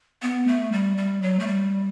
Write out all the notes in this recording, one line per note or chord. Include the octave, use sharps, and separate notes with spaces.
B3
A3
G3
G3
F#3
A3
G3